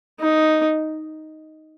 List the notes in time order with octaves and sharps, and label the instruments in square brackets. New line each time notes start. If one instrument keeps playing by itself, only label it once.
[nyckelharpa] D#4